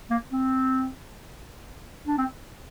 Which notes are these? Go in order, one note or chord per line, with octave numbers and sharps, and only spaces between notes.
A#3
C4
D4
C4